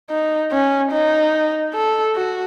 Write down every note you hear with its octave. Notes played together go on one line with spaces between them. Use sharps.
D#4
C#4
D#4
A4
F#4